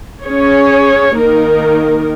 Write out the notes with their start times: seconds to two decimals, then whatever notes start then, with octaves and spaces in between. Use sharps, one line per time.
0.24 C#4 G#4 C#5
1.15 D#3 A#3 D#4 A#4